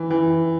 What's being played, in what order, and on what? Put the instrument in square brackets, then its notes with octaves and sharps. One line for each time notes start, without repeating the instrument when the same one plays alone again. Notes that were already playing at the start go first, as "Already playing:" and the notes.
Already playing: [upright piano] E3
E3